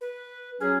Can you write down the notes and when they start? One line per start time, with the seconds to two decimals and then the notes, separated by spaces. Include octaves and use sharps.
0.01 B4
0.61 F#3 C#4 G#4